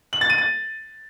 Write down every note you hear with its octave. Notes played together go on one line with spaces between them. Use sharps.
F#7
A6
D#7
A6